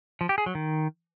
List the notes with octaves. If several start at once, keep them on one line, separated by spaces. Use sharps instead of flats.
F3
G4
G#4
F#3
D#3